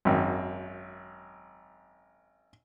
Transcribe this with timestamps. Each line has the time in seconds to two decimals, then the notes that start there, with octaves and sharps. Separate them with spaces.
0.05 G#1 F#2